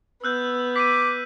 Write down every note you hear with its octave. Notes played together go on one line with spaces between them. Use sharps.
B3 E6 F#6 G6
D6 B6 C7 D#7